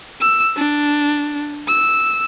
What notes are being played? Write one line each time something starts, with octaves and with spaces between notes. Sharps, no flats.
E6
D4
E6